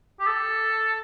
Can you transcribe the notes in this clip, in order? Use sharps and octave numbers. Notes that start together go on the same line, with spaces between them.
G4
A4